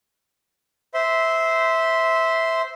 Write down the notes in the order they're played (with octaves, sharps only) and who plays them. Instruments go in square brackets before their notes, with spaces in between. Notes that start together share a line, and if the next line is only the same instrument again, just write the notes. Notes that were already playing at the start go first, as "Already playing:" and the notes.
[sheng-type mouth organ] C5 E5 C6